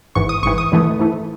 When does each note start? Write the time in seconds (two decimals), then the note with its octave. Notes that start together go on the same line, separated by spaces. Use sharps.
0.15 G#1 G#2 E3 C#6
0.29 D#6
0.43 G#1 G#2 E3 C#6
0.58 D#6
0.72 G#2 E3 A3
0.99 G#2 E3 A3